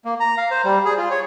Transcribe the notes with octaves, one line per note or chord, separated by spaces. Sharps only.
A#3
A#5
F5
C5
G3
G#4
F4
C#5